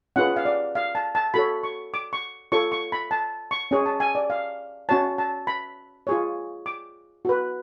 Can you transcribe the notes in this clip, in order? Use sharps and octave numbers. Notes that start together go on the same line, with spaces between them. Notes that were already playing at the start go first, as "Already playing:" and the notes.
C#4 F4 G#4 B4 F#5
F5
D5
F5
A5
A5
F#4 A4 C#5 B5
C#6
D6
C#6
F4 A4 C#5 C#6
C#6
B5
A5
C#6
C#4 G#4 C#5
A5
G#5
D5
F5
C#4 F#4 C#5 A5
A5
B5
F4 G#4 C#5
D6
F#4 B4